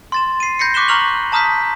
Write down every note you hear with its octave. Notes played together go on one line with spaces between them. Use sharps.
C6 A6 E7
C7 D#7
B5 G6 A#6 C7 C#7
C#6 D6 F#6 B6 E7 G7
A#5 C#6 F6 F7 F#7
A5 A#5 D#6 F6 G6 B6